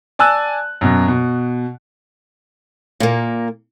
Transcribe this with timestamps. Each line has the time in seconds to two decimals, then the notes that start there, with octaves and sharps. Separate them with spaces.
0.19 D5 G#5 A5 E6 F#6
0.81 F#2 B2
1.08 B2
3.00 A#2 A#3